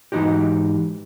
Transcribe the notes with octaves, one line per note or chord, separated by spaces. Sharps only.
G#2 E3 A3 D#4 F#4 G4